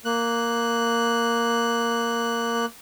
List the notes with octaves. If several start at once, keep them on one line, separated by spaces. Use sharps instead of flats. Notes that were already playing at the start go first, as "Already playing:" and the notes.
A#3 F#6